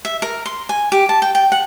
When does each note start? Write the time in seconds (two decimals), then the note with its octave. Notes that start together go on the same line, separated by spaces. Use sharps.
0.05 E5
0.22 A#4
0.46 C6
0.69 G#5
0.92 G4
1.09 A5
1.22 G5
1.35 G5
1.52 F#5